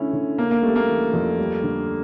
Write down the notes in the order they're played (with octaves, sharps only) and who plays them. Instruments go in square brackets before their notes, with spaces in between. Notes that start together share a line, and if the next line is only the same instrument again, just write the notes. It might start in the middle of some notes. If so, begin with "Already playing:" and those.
Already playing: [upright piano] D3 A3 E4 [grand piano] C#4
[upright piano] D3
[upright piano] C#3 [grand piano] A#3
[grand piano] A#3
[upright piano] G3 [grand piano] A3
[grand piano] A#3
[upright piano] E3
F2
G3
D3